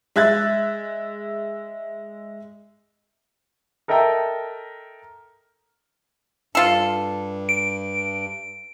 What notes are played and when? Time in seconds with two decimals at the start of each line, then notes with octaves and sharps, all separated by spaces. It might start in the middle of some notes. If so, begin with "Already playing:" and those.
0.16 G#3 E5 F#6 G#6 A6
3.88 A4 A#4 D#5 E5 G5 A#5
6.55 G2 F4 A4
7.49 D7